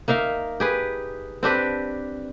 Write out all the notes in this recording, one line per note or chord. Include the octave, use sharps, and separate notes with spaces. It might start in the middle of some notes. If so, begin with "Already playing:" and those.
A#3 D#4 E5 F5
G4 G#4 B4
C4 D4 G4 B4